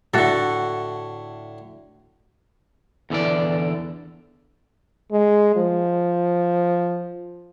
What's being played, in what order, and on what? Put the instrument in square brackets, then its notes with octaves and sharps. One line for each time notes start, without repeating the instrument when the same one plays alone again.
[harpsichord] A2 D3 [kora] F#4 A4
[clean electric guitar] E2 D3 E3 D5
[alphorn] G#3
F3